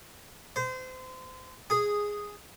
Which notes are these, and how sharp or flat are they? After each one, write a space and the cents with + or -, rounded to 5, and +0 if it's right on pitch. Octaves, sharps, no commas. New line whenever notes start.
C5 -30
G#4 -5